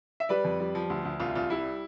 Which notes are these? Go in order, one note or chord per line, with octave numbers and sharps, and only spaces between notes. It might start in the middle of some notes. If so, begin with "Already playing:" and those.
E5
G3 B4 D5
F2
G3
F3
D2
D2
C2 F4
C2 F4
G3 E4